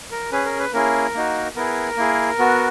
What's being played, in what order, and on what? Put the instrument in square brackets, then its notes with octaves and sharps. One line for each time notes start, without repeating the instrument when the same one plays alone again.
[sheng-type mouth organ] A#4
C#4 G#4 B4
A#4
B4
A#3 C#4 E4 G#4 A#4
A#3 D#4 F#4
B3 E4 G#4 A#4
A#3 E4 G#4
B3 F#4